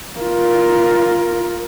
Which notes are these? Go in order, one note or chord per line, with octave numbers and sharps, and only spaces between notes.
F4 A#4